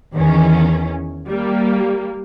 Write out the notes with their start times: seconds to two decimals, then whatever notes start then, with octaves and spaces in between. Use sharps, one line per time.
0.15 E2 D#3 E3 C#4
1.28 G3 A#3